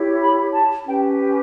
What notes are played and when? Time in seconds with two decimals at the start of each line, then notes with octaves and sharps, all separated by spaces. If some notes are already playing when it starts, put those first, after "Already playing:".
Already playing: E4 G4 C#5
0.21 B5
0.53 A5
0.86 C#4 G4 B4 G5